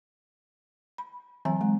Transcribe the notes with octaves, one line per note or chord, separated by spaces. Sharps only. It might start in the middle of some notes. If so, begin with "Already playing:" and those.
B5
E3 F#3 C4 E5 G#5 A#5
G#3